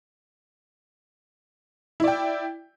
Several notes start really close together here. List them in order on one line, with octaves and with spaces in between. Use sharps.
E4 D5 G5